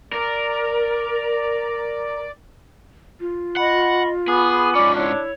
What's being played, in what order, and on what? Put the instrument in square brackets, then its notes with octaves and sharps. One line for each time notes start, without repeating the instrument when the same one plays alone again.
[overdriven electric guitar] A#4 [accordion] D5
[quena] F4
[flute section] D#5 B5 C#6 [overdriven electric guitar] F#5
[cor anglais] B3 [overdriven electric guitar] G#4 [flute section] G#5 B5 D6
[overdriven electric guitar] G#2 C#4 [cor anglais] D5
[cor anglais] D4 [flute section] E4 C#5